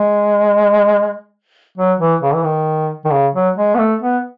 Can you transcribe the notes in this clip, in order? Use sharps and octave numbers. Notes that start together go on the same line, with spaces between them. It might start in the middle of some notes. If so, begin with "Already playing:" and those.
Already playing: G#3
F#3
E3
C#3
E3
D#3
D#3
C#3
F#3
G#3
B3
A3
B3